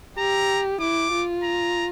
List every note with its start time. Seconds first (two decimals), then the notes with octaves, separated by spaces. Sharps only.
0.18 G4 A#5
0.81 E4 D6
1.13 F4
1.43 A#5